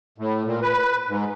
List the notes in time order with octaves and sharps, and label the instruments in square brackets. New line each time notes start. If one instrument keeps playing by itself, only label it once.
[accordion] A2
A#2
B4
G#2